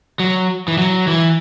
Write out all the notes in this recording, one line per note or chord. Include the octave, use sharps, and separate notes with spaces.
F#3
E3
F#3
E3